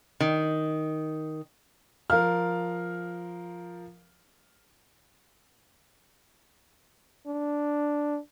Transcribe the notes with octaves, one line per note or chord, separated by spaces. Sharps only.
D#3
F3 A#4 F5 F6
D4